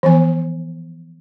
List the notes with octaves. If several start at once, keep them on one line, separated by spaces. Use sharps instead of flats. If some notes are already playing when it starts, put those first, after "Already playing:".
E3 F3 B3 G#5